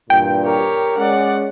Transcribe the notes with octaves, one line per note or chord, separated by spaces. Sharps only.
G2 A#2 E3 G5
G4 A#4 C#5
G#3 C#4 D5 F#5